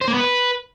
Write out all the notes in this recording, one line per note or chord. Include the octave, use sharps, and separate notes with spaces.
C5
A#3
B3
B4